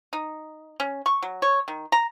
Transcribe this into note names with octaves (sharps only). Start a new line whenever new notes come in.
D#4
C#4
C#6
F#3
C#5
D#3
A#5